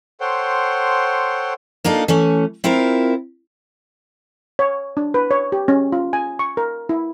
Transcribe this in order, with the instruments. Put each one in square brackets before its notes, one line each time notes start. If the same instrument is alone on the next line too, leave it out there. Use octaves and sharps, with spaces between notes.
[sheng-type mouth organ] A4 C5 C#5 F#5 G5 C6
[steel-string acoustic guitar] A#3 D4 D#4 F4 A4
E3 A3 C#4
C4 E4 F4 A#4
[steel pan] C#5
D4
B4
C#5
G4
C#4
F4
G#5
C#6
A#4
E4